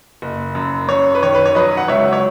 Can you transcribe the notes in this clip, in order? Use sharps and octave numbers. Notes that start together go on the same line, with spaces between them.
F#1
F#2
F#2 C#5
B4
D#3 C#5
B4
C#5
F#3 B4 D#5
F#5
C#2 C#5 E5
C#5